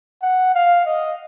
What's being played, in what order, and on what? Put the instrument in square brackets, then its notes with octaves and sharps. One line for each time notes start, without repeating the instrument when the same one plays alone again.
[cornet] F#5
F5
D#5